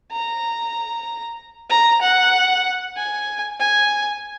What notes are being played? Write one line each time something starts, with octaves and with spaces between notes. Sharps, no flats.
A#5
A#5
F#5
G#5
G#5